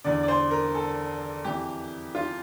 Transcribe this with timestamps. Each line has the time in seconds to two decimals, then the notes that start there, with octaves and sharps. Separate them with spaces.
0.04 E2 D3 D5
0.23 D5
0.28 C5
0.51 A#4
0.75 A4
1.44 F2 E3 G4
2.15 F4